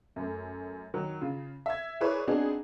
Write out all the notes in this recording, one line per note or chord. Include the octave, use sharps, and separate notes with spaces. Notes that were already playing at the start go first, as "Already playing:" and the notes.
F#2 A3
D#3 F#3
C#3 F4
E5 G#6
E4 G#4 A#4 B4 C#5 D5
B3 C4 D4 D#4 F#4 G#4